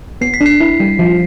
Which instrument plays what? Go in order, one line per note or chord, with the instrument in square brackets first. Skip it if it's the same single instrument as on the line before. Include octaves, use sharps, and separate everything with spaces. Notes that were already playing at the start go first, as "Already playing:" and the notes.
[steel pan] B3 [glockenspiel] C7
[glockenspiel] B6
[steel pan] D4
[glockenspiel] C7
[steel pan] E4
G3
F3